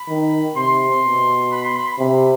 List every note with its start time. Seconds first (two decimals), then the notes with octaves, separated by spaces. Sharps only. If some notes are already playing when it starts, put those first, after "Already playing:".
Already playing: B5
0.08 D#3
0.55 C3 C6
1.03 B2
1.52 B5
1.64 C6
1.76 B5
1.87 B5
1.99 C3